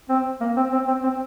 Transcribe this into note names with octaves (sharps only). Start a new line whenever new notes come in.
C4
A#3
C4
C4
C4
C4